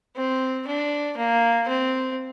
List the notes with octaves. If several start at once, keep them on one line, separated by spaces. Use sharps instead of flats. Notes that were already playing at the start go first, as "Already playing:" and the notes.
C4
D4
A#3
C4